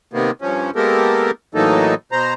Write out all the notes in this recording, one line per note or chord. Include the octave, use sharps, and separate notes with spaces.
C3 D#3 A#3 B3
G2 F3 C#4
G#3 A#3 B3 G4 A4 A#4
A2 E3 F#3 A#3 D#4 A4
B2 C5 A#5